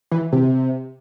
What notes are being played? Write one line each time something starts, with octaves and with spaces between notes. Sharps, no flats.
E3
C3